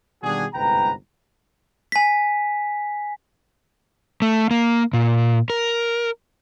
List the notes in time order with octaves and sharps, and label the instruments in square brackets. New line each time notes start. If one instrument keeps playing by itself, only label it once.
[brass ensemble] B2 D#3 G3 D4 F#4 G#4
G1 C2 G#2 B4 G5 A#5
[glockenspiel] G#5 B6
[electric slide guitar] A3
A#3
A#2
A#4